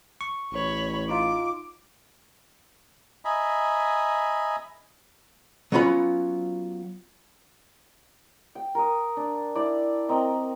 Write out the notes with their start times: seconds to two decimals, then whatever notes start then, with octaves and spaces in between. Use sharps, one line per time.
0.21 C#6
0.52 A1 C#5 B5
1.09 D#4 F4 D6
3.25 D#5 E5 G#5 A#5 B5
5.72 F#3 B3 C#4 F4 B5
8.55 G5
8.75 A#4 D#6
9.17 D4
9.55 E4 D5
10.09 C4 A#4 D#5